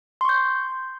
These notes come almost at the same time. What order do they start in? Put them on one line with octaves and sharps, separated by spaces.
C6 C#6 G6